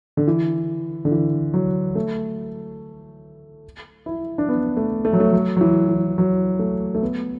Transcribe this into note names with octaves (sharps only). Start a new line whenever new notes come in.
D3
E3
D3
E3
F#3
A3
E4
D4
B3
A3
A3
F#3
A3
F#3
F#3
E3
E3
F#3
A3
A3
B3